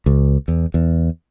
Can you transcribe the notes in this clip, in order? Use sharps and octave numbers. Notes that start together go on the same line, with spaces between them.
C#2
E2
E2